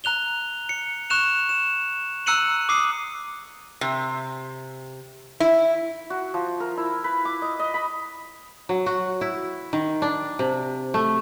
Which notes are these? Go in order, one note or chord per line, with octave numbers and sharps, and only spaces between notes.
A#5 F#6 F7 G7
C#7
C#6 F#6 E7 F7
E7
A#5 E6 F#6 C#7 D#7 F#7
D6 D#6 C7 D#7
C3
E4
F#4
F3
A#4
E4
B4
D6
D#5
D#5
B5
F#3
F#4
E4
D#3
D4
C3
A3